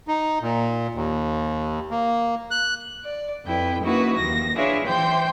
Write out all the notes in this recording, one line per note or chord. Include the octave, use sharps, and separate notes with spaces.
D#4
A#2
D#2
A#3
F#6
D5
F2 E4 B4 G5
A#3 C#4 D#4 E4 F#4 B4
D#2 F3 A#6
D4 E4 F4 G#4 B4 C#5
E3 C5 G5 G6